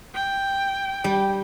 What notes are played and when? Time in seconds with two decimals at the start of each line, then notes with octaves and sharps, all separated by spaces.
0.15 G5
1.04 G3